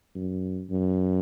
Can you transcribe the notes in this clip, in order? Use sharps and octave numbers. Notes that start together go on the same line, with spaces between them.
F#2
F#2